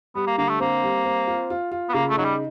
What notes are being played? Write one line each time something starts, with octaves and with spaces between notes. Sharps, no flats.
G3 B3
A#3
D3 A#3
A3
A#3 C4
G3
C4
F4
F4
F4
B3
C#3 A#3
A3
F#3 D#4
G3